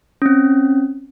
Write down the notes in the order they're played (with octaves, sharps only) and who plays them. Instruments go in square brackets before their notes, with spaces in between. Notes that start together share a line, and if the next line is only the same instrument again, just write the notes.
[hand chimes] C4 C#4